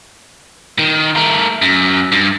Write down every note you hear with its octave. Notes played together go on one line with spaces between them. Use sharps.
D#3
A3 A#4
F#2
G2